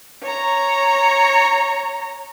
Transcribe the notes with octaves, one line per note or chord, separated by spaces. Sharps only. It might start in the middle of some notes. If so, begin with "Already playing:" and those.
C#5 A#5